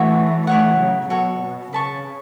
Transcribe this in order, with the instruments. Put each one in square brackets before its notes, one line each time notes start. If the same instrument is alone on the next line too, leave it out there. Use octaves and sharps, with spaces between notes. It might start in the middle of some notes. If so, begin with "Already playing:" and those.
Already playing: [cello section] E3 A3 [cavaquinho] F#4 C#5 E5
[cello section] E3 A3 [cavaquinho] E4 C#5 F#5
[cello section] C#3 F#3
[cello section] B2 [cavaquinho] F#4 A4 C#5
[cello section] B2
[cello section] C#3 [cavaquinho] B4 A5 C#6